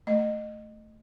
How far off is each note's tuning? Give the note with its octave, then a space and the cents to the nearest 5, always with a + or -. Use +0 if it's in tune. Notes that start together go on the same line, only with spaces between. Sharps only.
A3 +0 D#5 -20 A#5 +0